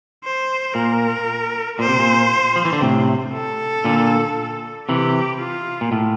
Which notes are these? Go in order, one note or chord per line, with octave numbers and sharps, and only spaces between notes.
C5
A#2 A#4
A#2 C5
C3
A#2
F3
E3
D3
A2 C3
A4
A#2 D3
C3 E3 G4
F4
A#2
A2